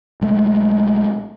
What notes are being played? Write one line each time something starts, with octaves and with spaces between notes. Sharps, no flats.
B1 G#3 A3